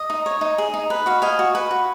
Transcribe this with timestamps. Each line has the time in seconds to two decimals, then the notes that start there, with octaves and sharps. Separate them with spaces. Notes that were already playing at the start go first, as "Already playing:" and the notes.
Already playing: D#5
0.10 D#4
0.26 C#5
0.41 D#4
0.58 G#4
0.74 D#4
0.90 B4
1.06 F#4 F5
1.22 D#5 F5 G#5
1.39 F#4
1.55 B4
1.71 F#4